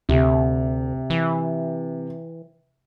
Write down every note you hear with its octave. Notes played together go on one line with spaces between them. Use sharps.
D2 C3
E3